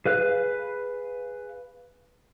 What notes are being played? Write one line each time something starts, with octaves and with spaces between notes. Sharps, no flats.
G#4 B4 F5 F#6